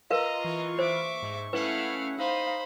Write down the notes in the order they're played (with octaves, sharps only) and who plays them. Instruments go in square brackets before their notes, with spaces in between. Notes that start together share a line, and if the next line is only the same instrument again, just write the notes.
[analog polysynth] F4 [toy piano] A#4 B4 F5 [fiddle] D#5 A#5
[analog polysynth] E3 F4 [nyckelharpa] C#6
[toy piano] C5 [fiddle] E5 D6
[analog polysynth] G#2
[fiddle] A3 F5 [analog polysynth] C#4 E4 F#5 [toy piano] B4
[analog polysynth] D#4 [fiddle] C5 B5 [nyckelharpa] F5